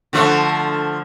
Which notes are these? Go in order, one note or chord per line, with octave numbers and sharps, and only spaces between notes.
D3 F3 A3